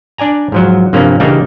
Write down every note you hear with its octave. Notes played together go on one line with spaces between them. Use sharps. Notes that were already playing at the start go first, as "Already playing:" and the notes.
D4 D5 G#5 A#5
G#2 F3 F#3
G2 C3 F3 A#3 C#4
C#3 E3 G3 A#3 D4 D#4